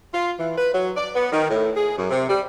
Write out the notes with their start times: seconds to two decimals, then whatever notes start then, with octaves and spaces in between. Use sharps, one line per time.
0.14 F4
0.39 E3
0.57 B4
0.73 F#3
0.97 D5
1.15 B3
1.32 D#3
1.50 A2
1.76 G#4
1.97 F#2
2.10 C3
2.29 G3